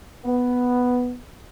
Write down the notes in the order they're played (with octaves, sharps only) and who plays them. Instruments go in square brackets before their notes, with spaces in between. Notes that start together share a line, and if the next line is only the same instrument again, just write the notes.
[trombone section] B3